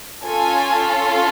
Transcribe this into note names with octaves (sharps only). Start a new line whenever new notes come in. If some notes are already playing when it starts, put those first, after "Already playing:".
C#4 F4 A4 G#5